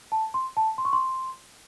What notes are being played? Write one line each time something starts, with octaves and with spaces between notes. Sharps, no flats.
A5
C6
A5
C6
C#6
C6